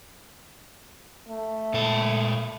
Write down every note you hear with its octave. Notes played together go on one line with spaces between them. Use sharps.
A3
A#2 A4